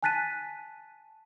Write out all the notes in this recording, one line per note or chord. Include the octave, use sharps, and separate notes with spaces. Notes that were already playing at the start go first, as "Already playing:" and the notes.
G#5 A5 F#6 A6 B6 D#7